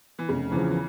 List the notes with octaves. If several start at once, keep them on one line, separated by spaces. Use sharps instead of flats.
E3
F1 C#3
E2 C#3 E3 F3
E3